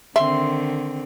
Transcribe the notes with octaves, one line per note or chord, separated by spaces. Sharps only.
D3 D#3 C4 E5 C6